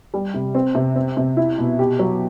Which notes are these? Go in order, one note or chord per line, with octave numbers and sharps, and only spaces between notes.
G3
C3
C4
C3
C4
C3
E4
B2
G4
F#3